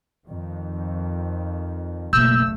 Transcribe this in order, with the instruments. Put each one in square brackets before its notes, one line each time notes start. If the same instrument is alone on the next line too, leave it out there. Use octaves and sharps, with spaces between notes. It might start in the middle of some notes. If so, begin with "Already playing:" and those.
[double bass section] F2 D#3
[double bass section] F#1 B1 A3 [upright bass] B2 A#3 [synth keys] E6 [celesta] G6